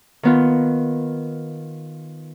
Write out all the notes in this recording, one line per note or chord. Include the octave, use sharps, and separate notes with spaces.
D#3 B3 F4